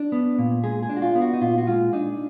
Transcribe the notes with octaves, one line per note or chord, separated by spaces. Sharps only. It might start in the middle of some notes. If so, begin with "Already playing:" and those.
Already playing: D4
B3
A#2
G#3 G#4
G#4
D4
F#4
F4
B3
F#4
D#4
A#2 F4
F#4
G#3 F4
D4 D#4